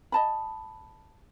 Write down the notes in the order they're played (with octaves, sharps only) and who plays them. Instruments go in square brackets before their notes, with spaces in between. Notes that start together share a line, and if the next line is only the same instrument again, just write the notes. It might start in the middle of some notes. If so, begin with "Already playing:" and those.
[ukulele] D#5 A5 B5